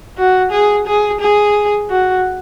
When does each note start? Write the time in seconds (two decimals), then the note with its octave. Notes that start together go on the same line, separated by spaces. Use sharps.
0.18 F#4
0.51 G#4
0.87 G#4
1.20 G#4
1.90 F#4